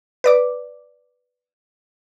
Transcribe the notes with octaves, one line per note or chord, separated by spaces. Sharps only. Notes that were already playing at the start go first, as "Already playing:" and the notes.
B4 D5 D6